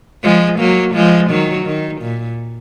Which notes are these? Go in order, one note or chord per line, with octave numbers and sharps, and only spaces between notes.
F3 G#3
F#3 A#3
F3 G#3
D#3 F#3
D#3
A#2